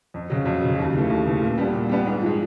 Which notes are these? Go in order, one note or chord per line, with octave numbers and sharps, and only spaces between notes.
F2
C#3 F#3
F2
C#3 F#3
D#2
C#3 E3 A3
D#2
C#3 E3 A3
A#2
G3 B3 D4
A#2
G3 B3 D4
G#2
F3 G#3